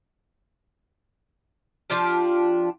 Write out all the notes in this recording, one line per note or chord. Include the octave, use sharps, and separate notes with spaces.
F3 D4 F4 G4